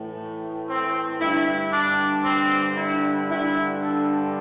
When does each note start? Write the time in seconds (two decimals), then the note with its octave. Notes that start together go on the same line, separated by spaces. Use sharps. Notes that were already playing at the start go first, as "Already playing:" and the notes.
Already playing: A2 E3
0.69 C4
1.21 G2 D3 E4
1.72 D4
2.25 C4
2.76 E4
3.29 G2 D3 E4
3.80 A4